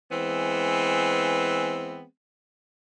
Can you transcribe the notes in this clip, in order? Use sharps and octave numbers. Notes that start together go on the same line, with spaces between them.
E3 G#3 B3 C4